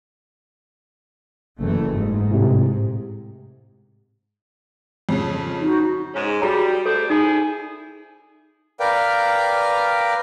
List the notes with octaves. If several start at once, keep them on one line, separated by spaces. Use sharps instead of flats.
F#1 E3 A3
G#2
A2 C3
F2 C#3
D#4 F#4
G#2 G#3 C#4
G3 F#4 G#4 A#5
A3 A4 C5 D5
D#4 E4 G#4
A#4 B4 D5 F5 G5